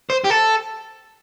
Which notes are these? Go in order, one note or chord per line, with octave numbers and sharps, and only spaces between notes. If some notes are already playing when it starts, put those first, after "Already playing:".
C5
G4
A4